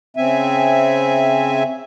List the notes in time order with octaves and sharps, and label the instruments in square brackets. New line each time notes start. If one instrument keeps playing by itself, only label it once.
[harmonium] C#3 C4 E5 G#5